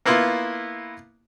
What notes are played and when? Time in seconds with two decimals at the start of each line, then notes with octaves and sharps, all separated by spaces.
0.06 A#3 B3 E4 F4